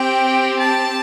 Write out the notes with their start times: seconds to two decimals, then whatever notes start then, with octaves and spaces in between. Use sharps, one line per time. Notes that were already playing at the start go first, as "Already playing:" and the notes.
Already playing: C4 G4 G5
0.61 A5